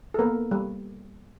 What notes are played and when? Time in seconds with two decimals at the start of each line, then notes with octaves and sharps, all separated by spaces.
0.14 A4
0.19 A#3 B3 A#4
0.51 G3